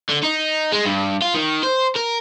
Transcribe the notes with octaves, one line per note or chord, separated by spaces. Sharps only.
D3
D#4
G#3
G2
F4
D#3
C5
A#4